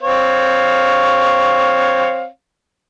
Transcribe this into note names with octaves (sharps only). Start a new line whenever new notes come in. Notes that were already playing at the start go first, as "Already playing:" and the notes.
C4 C#5 F5